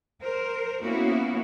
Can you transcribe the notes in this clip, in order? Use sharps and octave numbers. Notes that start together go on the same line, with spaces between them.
A#4 C5
A#3 B3 C#4 E4 F#4